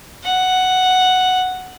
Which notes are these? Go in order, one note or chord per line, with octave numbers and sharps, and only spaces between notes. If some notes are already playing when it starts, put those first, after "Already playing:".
F#5